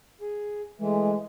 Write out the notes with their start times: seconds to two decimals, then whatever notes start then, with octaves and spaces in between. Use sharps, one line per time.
0.21 G#4
0.79 E3 G#3 A3